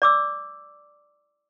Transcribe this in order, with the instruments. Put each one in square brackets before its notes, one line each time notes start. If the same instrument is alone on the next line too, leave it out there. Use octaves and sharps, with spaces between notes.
[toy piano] D5 D6 E6